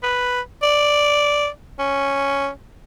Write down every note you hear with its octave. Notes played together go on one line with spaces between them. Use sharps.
B4
D5
C#4